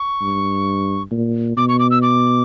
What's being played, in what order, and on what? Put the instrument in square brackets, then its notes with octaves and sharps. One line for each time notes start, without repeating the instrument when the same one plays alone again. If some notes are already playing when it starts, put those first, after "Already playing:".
Already playing: [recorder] C#6
[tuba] G2
A#2
[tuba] B2 [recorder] D6
[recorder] C#6
D6
E6
D6